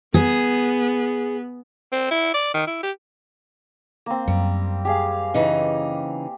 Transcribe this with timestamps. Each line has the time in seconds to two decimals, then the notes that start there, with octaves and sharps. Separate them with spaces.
0.14 B3 G#4
1.92 C4
2.11 E4
2.34 D5
2.54 D#3
2.67 E4
2.83 G4
4.06 A#3 C4
4.28 F#2 G3
4.85 G4 G#4 F5
5.34 C#3 E3 D#4